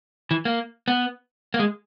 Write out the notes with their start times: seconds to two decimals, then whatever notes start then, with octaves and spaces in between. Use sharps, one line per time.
0.31 E3
0.45 A#3
0.88 B3
1.54 A#3
1.59 G#3